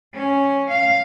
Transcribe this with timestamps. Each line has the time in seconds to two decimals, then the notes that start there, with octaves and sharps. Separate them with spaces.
0.15 C#4
0.70 F5